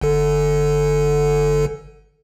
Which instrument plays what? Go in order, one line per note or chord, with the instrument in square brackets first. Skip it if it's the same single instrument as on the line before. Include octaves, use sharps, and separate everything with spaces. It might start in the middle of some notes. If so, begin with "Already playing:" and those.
[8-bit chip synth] G1 D3 A4